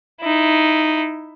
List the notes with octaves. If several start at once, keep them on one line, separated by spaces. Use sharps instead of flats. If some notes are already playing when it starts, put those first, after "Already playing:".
D#4 E4